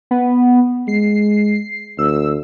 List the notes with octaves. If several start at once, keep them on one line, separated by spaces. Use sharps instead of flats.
B3
G#3 C7
D2 E6